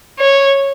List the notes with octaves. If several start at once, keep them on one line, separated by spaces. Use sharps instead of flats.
C#5